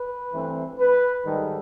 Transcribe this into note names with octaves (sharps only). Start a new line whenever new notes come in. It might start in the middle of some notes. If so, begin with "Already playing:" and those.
Already playing: B4
G2 E3 A3 C4
B4
G#2 D#3 G3 A4